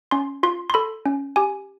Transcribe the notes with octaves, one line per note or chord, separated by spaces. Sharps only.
C#4 C6
F4 C6
C6
A4 B5
C#4
G4 G#5